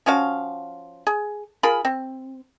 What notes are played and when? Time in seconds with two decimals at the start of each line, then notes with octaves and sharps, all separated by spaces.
0.06 F3 C#4 F#4 F5
1.07 G#4
1.63 F4 G#4 A#4 B5
1.85 C4